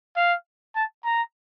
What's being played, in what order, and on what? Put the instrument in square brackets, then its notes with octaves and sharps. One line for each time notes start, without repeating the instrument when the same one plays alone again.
[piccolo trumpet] F5
A5
A#5